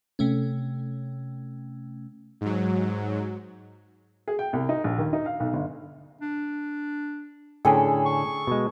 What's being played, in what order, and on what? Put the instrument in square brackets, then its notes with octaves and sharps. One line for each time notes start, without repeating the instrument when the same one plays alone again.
[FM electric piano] C3 A3 C#4
[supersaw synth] G#2 F#3
[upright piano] G#4
G5
C2
D#4
A#1
D#2
D#4
F5
B1
G1
[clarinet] D4
[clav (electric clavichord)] A2 D3 C#4 [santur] G#4 A4 [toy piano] G5 G#5
[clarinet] C#6
[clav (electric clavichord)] B2 G#3